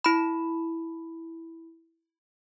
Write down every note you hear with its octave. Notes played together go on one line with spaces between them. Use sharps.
E4 B5